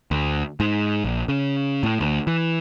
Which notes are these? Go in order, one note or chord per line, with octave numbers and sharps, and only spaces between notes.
D2
G#2
A#1
C#3
A2
D2
E3